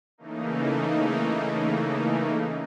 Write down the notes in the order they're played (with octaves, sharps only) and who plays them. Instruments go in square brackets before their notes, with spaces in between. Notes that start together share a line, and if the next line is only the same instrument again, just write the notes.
[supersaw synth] C#3 E3 A3 A#3 D#4